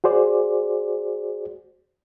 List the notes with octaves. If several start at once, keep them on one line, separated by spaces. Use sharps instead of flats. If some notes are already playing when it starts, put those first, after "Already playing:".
F#4 G#4 C5 D5